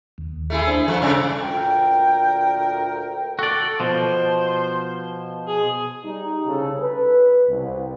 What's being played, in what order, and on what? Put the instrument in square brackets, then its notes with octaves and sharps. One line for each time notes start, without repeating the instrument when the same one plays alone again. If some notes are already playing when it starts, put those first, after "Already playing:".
[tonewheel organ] D#2
[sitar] A3 E4 G#4
[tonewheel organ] D4 C5
[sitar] G2 F3 [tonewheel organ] A4 C#6
[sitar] G2 C#3 D4
[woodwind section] D2 A#2 A#4 G5
[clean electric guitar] F#4 D5 [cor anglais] A4
[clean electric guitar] B2 F3 [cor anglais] C5
[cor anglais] G#4
[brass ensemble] G3 D#4
C2 C#3 A4
B4
C2